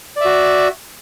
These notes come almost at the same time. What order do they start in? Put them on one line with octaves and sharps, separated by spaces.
D5 E5 F#4